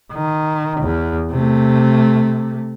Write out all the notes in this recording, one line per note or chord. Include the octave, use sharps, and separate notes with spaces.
D#3
E2
C3 A3